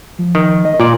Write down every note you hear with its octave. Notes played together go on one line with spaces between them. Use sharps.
F3
D#3
D#5
A#2 F4 D5